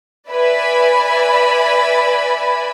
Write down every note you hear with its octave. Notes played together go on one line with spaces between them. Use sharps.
B4 D5 E5 G#5 B5